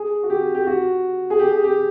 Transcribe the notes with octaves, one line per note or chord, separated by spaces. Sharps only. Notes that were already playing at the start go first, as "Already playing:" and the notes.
Already playing: G#4
F#4
G4
G4
F#4
G#4
G4
G#4
G4